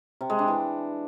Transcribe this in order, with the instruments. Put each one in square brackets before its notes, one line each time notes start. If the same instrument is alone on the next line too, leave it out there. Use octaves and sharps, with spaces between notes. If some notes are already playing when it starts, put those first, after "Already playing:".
[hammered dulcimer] C3
G#3
D4
E3